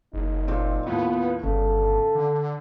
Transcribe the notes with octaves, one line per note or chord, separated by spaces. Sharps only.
F#1 D#4
A#2 C4
D#2 A2 B3 F4
G1 C#3 A4
D3